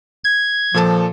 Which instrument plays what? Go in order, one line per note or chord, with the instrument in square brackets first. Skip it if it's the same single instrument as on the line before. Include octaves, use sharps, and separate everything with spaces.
[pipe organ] G#6
[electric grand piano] A#2 A4 A5 [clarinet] F3